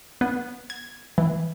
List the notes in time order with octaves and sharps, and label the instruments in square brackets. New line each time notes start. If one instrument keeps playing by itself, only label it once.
[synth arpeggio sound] B3
G#6
E3